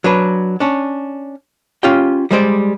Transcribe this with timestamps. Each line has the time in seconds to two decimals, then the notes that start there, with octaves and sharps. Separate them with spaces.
0.04 F#3 D4 B4
0.60 C#4 D4
1.83 C#4 F4 G4 G5
2.31 G3 G#3 C5 D5